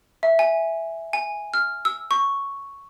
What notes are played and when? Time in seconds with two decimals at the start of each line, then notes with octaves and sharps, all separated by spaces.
0.23 E5
0.39 G#5
1.13 G#5
1.54 F6
1.85 E6
2.11 C#6